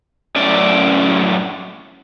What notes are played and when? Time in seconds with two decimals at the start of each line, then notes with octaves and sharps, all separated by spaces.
0.36 F#2 A2 C#4 D5